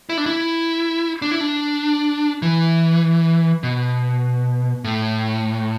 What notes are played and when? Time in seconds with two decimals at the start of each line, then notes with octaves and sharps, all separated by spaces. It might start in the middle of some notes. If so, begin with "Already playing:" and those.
0.09 E4
0.17 D4
0.26 E4
1.22 D4
1.31 E4
1.41 D4
2.42 E3
3.63 B2
4.84 A2